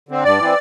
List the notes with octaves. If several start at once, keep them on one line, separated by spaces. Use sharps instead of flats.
D3 C4
G2 D5
E3 C4